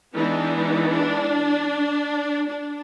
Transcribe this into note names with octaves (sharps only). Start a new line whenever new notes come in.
E3 G#3 B3 D4 D#4
D4
D4